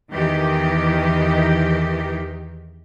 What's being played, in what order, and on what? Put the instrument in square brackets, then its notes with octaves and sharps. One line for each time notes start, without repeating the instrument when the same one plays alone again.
[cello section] E2 D#3 E3 D#4 G4